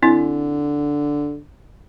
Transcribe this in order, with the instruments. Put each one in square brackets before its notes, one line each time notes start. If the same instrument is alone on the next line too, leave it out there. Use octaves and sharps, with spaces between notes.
[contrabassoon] D3 [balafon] C4 E4